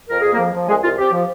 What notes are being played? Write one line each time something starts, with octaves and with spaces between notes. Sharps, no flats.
F2 A#4
F2 G#4
A#3 A#4
F3
F3
C2 G#3 G#4
C2 F4
C4 G4
F3